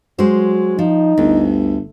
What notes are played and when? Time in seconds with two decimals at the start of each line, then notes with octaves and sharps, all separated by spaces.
0.19 F#3 G#3 C5
0.79 F3 D#4
1.18 G1 D2